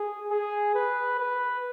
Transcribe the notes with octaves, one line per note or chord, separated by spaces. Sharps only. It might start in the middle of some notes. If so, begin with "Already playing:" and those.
Already playing: G#4
G#4
B4
B4